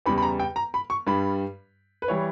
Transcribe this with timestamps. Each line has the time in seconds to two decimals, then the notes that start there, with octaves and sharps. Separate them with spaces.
0.06 E2 C#3 G3 B5
0.18 B5
0.22 A#5
0.40 G5
0.56 A#5
0.74 B5
0.90 C#6
1.07 G2 G3 B5
2.02 B4
2.08 E3 G3 C#5